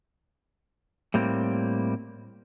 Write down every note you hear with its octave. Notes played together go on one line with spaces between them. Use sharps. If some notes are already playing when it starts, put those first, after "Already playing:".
A2 G3 A#3 C4